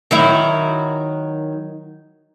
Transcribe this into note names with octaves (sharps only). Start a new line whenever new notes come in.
D#3 F#3 E4